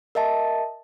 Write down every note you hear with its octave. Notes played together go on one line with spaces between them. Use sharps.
A#4 D#5 E5 A5